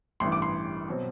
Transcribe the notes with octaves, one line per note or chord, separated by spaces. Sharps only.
A1 G2 E3 C6
D6
C6
B2 F#3 C4